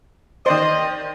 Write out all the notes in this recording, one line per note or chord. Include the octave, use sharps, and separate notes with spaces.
D#3 C5 D5 D#5 C6